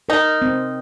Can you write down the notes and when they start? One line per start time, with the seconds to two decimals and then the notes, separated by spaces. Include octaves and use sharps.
0.09 D#4 A#4
0.42 C4